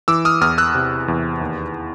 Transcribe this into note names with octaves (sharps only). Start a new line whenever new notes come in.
E3 D6 E6
D#6 F6
E2 D#6 F6
E6 F#6
C3
E2
D#2